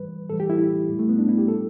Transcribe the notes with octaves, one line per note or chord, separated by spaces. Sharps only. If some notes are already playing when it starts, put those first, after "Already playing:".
Already playing: A2 E3 G3 B4
A2 E3 G3 A4
G4
E4
A2 G3
A3
B3
D4
E4
G4
A2 G3 A4